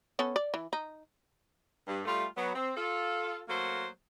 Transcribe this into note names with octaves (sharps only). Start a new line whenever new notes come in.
B3 C#4 A4
D5
E3
D#4
G2
G3 A3 F4
F#3 B3
C4
F4 A4
F#3 A3 A#3 F#4 A4 C5